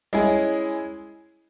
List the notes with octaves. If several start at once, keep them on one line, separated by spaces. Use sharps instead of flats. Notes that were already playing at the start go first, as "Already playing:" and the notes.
G#3 C#4 E4 G#4